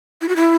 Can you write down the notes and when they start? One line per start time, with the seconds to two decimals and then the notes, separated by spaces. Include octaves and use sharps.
0.21 E4
0.29 F#4
0.36 E4